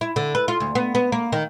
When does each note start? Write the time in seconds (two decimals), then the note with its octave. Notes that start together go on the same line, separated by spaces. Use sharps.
0.01 E4
0.16 D3
0.35 B4
0.48 F4
0.60 D2
0.75 B3
0.95 B3
1.12 A#3
1.32 D#3